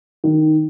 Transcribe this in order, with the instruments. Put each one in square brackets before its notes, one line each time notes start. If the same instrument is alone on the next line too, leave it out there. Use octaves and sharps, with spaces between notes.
[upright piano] D#3